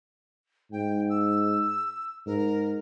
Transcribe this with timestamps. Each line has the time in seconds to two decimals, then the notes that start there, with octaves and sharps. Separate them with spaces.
0.72 G#2 G5
1.09 E6
2.26 G#2 A#4